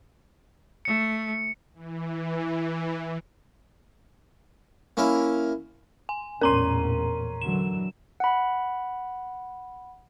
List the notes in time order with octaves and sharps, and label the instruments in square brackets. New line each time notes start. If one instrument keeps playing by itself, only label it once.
[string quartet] A3 [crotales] C#7
[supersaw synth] E3
[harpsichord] A#3 C#4 E4 A#4
[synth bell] G#5
[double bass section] A#1 E2 A2 [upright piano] C#4 C6 [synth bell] A#4 A#5 D#7
[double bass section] D3 E3 F#3 [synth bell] E7
[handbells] F#5 B5